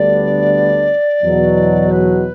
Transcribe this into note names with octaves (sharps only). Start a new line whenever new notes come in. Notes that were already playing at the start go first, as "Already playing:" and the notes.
Already playing: D2 D3 G3 B3 D4 D5
E2 B2 F#3
B4